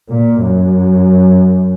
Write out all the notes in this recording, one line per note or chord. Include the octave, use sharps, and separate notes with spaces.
A#2
F#2